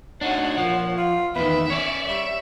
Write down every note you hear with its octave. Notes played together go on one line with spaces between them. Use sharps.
D4 D#4 F#4 C#5 F#5
A#2 F3
F4
E2 D#3 B4 E5
C#4 C#5 D5
G3 E5